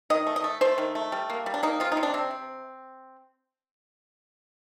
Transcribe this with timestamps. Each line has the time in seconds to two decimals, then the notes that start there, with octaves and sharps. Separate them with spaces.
0.10 D#3 D#5
0.27 A3
0.36 D#5
0.44 A3
0.61 A3 C5
0.78 D#3
0.95 A3
1.12 G3
1.30 A#3
1.46 G3
1.54 D4
1.63 A#3 D#4
1.80 C3 F4
1.92 D#4
1.97 C3
2.03 D4
2.14 C3 C4
2.31 C3